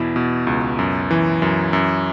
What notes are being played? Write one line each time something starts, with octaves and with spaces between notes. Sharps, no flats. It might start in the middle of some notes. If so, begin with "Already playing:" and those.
Already playing: E2 B2 E4
B2
C#2
F#2
E3
F#2
F#2